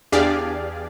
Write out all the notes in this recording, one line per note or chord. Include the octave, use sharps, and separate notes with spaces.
E2 D4 G4 G#4 D5 F5